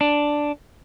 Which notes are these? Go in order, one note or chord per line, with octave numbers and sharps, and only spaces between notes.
D4